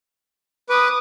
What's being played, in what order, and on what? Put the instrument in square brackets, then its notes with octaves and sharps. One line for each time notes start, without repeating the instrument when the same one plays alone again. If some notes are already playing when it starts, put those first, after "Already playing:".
[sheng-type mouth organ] B4 [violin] D6 D#6